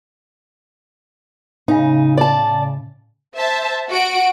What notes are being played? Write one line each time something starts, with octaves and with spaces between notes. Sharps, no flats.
A2 C#3 D#4
D5 A5
C5 E5 A5
F#4 F#5 D7